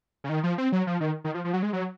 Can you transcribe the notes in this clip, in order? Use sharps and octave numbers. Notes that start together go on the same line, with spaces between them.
C#3
D#3
F3
C4
F#3
F3
D#3
D#3
F3
F3
F#3
G#3
F#3